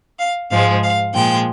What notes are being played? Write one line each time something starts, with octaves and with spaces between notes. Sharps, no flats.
F5
G#2 F3 G#3 F5
F5
A#2 F3 G#3 G5